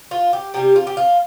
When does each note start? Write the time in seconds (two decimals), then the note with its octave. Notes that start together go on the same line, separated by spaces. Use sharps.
0.11 F4
0.33 G4
0.54 C3 G3 G4
0.76 F4
0.87 G4
0.97 F4